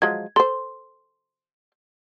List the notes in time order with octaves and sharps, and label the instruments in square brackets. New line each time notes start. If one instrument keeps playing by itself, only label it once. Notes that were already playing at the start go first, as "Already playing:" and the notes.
[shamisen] F3 F#3 G#3 [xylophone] G#6
[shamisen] A4 C5 [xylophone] C6